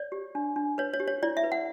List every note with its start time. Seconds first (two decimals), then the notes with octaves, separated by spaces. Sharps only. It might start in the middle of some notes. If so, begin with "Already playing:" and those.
Already playing: C#5 D5
0.12 G4
0.35 D4
0.56 D4
0.78 B4 C#5
0.94 C#5
1.00 G4
1.07 C#5
1.23 E4 D5
1.37 E5
1.44 B4
1.52 F#5